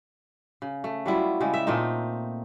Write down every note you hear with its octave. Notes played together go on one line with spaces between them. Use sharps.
C#3
A3
F#3 G3 E4 F4
C#3 G3 G#3
E5
A#2 A3 C4 D#4